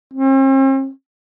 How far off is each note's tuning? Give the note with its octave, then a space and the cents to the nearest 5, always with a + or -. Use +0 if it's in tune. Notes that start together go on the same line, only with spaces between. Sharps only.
C4 +45